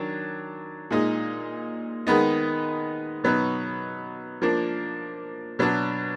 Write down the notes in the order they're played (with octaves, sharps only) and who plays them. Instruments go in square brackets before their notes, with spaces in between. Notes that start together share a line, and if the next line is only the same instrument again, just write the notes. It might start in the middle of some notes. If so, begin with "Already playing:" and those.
Already playing: [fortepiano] D#3 F#3 D4
A#2 G#3 D#4
D#3 G#3 B3 D#4
B2 F#3 B3 D#4
F3 A#3 D4
B2 F#3 D4